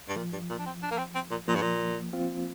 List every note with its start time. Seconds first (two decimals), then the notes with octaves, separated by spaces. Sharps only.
0.08 G2
0.16 A#2 F3
0.33 G2
0.50 A#2
0.59 D4
0.66 C4
0.82 D4
0.91 A#3
0.98 C4
1.15 C4
1.31 A#2
1.48 A#2 F3 A#3
1.55 G2
1.62 A#2
2.13 C4 F4